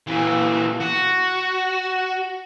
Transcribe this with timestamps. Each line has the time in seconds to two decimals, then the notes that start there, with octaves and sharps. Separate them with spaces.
0.07 A#2 E3
0.81 F#4